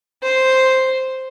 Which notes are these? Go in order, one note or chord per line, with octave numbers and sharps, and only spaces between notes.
C5